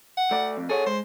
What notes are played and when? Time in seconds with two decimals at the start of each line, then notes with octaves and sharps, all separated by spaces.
0.17 F#5
0.31 A3 D5
0.57 F2
0.69 G#4 A4 C#5 F#5
0.86 G#3 C5